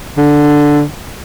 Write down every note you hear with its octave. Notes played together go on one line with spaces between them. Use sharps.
D3